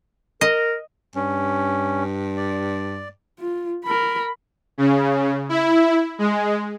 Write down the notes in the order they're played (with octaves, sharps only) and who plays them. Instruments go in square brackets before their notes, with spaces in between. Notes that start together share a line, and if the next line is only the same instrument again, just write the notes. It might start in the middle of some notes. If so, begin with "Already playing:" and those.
[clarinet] A#4 [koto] D#5
[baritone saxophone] G2 [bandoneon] C#4
[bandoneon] D5
[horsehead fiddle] F4
A#4 B5
[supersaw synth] C#3
E4
G#3